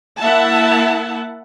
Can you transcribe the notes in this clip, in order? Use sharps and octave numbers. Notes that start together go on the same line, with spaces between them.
A#3 E4 E5 F#5 A5